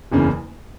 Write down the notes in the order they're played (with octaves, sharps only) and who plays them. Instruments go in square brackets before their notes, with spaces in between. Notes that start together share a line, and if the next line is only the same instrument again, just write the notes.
[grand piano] F#1 E2 C#3